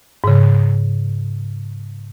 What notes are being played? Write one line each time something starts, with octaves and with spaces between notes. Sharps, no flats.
G#2 C#3